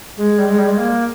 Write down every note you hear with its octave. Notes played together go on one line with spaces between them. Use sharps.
G#3
G3
G#3
G3
G#3
A#3